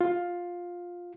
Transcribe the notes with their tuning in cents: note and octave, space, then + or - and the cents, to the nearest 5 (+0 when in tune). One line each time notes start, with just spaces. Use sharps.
F4 +10